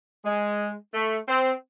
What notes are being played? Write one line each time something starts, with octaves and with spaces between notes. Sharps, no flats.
G#3
A3
C4